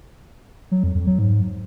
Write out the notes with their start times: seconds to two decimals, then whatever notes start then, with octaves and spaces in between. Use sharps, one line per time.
0.71 F#3
0.83 F2
0.95 F2
1.07 F#3
1.19 G#2